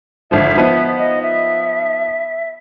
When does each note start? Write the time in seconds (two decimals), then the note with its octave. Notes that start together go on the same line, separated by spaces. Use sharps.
0.31 G#1 D3 F3 E5
0.57 F3 B3 D#4
0.98 D#5
1.22 E5